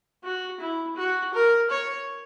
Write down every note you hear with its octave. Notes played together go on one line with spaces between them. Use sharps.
F#4
E4
F#4
A#4
C#5